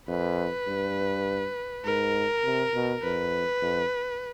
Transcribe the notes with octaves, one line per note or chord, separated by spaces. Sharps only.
F2 B4
G2
G#2 A#4
C3
B2
F2 B4
F2